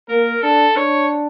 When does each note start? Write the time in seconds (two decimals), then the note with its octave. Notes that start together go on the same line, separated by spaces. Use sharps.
0.08 A#3 A#4
0.42 D4 A4
0.76 D4 C#5